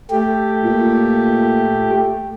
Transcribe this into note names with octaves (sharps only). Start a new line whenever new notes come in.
A3 G4
A#2